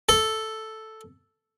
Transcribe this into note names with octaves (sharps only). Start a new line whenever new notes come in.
A4